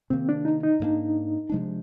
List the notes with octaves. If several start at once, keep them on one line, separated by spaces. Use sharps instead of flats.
C3 D#3 A#3 C4
D4
D#4
D#4
G#2 G3 A#3 D4
C3 F3 G#3 D4